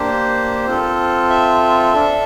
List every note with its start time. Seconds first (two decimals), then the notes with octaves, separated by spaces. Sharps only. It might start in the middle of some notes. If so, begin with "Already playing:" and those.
Already playing: A#3 D4 G4 C5
0.66 C4 F4 A4
1.30 E5
1.94 D4 A4